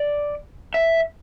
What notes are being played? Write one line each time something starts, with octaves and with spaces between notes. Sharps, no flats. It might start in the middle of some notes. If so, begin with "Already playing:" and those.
Already playing: D5
E5